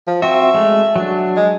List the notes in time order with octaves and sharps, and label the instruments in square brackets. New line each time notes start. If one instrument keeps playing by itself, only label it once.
[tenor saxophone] F3
[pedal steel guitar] C4 F#4 [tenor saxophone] E5
[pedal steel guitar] G#3 A3
F#3 D4
[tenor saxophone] G#3